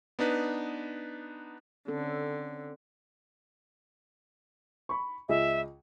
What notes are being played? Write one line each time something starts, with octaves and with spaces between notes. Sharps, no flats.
B3 D4 D#4 B4
D3 C4 C#4 A4
B5 C#6
C#2 G#4 D#5 E5